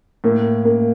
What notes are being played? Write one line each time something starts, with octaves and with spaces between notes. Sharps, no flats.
A2 A#3
A#3